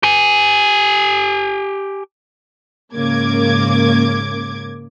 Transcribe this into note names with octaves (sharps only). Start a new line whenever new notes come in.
G4 G#5
G#2 C#3 A#3 D6 G#6